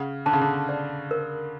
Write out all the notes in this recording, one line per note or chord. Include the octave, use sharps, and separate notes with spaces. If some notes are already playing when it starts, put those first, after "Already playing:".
Already playing: C#3 F#5
D3 A5
C#3
D3
D5
A#4